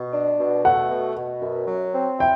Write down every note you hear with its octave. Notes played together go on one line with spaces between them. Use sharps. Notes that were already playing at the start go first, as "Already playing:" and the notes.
Already playing: B2
D4
B2
A3 F#5
B2
B2
F#2
F#3
C4
E4 G5